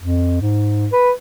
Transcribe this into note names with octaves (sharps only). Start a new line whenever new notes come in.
F2
G#2
B4